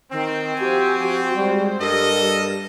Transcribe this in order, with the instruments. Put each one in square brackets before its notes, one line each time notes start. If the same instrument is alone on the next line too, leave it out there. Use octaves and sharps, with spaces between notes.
[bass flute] D#3 [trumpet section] C4
[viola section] F3 G4 G#5 [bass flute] F#4
[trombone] G3 [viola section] G#3 C5
[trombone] G2 [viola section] G3 [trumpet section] A4 D#5 [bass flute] A#4